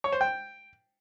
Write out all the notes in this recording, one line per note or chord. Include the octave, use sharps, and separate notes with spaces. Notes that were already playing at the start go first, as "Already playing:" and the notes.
C#5
C5
G5